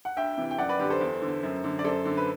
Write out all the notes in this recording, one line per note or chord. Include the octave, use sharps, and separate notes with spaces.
F#5
D2 E5 G5
C3 E3
G5
F#2 D5 F#5
B4 D5
D3 G4 B4
A4 C5
E2
D3
F#2
D3
D5
F#2 A4 C5
D3
B4